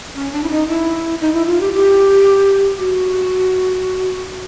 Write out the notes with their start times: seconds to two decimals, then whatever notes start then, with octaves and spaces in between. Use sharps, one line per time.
0.16 C#4
0.32 D4
0.43 E4
0.50 D#4
0.68 E4
1.21 D#4
1.33 E4
1.46 F4
1.61 G4
1.73 G4
2.78 F#4